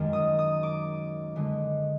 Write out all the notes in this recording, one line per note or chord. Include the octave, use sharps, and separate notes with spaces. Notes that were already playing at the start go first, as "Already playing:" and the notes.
Already playing: F#2 D#3 G#3
D#6
D#6
D6
D3 G#3 B3